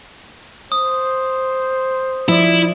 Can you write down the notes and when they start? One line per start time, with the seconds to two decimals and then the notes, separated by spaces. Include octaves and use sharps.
0.72 C5 D#6
2.29 F3 E4 D5